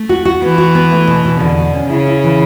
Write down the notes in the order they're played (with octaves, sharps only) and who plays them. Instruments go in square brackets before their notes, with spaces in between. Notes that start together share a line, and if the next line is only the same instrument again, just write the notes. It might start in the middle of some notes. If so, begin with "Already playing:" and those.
Already playing: [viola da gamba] A3
[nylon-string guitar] F#4
F#4
[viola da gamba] E3 [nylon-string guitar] B3
[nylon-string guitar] F#4
B3
A3
B2
B2
[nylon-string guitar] E2 [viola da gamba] D3
[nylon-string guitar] B2
C#4
[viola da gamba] C#3 [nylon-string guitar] E4
[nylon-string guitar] E4
E3